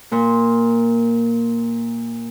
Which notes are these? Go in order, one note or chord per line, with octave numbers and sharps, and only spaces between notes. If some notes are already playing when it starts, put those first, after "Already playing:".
A#2 A#3